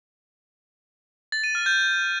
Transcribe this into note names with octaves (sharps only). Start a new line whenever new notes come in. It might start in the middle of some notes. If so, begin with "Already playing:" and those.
A6
D#7
F6
G6